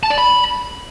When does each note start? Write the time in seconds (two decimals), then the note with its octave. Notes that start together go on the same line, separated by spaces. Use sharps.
0.03 A5
0.10 D5
0.18 B5